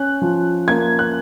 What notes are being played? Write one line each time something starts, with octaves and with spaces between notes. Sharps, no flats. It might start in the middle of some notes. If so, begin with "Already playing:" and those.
Already playing: C#4 F#6
F3
A#3 G#6
F#6